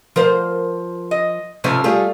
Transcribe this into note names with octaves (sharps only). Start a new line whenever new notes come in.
F3 A#4 C5
D#5
G#2 C3 F3 A3 C#4
G3 A3 F4 G#4